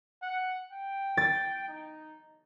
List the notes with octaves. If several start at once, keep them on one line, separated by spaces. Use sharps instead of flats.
F#5
G5
A6
D#4